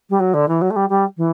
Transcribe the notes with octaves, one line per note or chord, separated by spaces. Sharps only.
G3
F#3
D3
E3
F#3
A3
G3
G3
E3